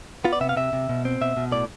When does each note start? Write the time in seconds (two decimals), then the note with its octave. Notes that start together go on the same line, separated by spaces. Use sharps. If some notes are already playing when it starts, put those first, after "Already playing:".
0.25 B3 F4
0.33 D5
0.41 C3 E5
0.49 F5
0.56 C3 E5
0.73 C3
0.89 B2
1.05 C4
1.21 B2 E5
1.37 B2
1.52 A2 D5